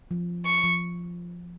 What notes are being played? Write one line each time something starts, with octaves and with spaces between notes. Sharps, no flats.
F3
C#6
F3